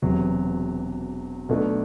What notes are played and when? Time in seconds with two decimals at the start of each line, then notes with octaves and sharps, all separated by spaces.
0.02 E1 E2 C3 F#3
1.49 B1 B2 A3 D4